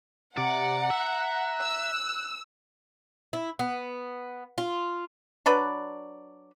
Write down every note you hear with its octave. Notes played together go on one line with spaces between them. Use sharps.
C3 D5 F#5 A#5
E5 F#6
E6
E4
B3
F4
F#3 D4 B4 D5